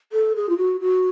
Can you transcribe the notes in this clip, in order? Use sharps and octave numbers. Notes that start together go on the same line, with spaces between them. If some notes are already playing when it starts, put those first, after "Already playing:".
A4
G#4
F4
F#4
F#4